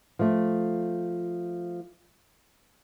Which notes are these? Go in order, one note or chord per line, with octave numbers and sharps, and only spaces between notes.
F3 A3